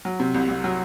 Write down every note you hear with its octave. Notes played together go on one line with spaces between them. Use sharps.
F#3
C3
C2
C2
F#3